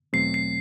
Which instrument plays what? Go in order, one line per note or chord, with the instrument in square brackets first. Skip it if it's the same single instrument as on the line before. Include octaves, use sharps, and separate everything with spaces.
[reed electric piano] E2 B2 F#3 A3 C4 [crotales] C7
[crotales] C7